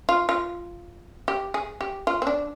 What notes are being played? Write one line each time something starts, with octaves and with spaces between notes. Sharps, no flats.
F4
F4
G4
G#4
G4
F4
C4
D4